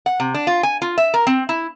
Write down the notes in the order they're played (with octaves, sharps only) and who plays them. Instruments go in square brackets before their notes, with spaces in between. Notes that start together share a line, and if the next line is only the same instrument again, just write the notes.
[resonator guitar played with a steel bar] F#5
C3
D4
F4
G#5
F4
E5
A#4
C4
E4